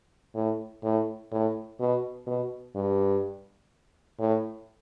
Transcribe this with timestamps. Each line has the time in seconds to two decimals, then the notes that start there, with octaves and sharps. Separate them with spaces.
0.35 A2
0.84 A2
1.32 A2
1.80 B2
2.27 B2
2.75 G2
4.20 A2